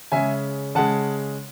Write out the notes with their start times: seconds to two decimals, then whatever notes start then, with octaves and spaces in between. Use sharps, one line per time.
0.12 C#3 G#3 E5 G#5
0.75 C#3 G#3 F#5 A5